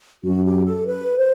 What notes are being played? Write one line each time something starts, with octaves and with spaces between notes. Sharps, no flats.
F#2 F#4
G4
A4
B4
C5